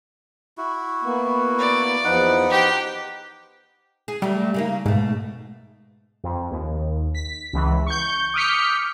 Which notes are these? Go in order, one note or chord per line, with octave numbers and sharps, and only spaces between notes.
E4 F#4
A#3 B3
D5
E2 F3 D#4 B4 F#5
G4 C5 G5
G#4
F#3 G3 A3
C#3 A#3 D#4
G#2 B2 A3
F2
D#2
B6
C#2 E3
C#6 G6
D6 D#6 F6 G6 B6 C#7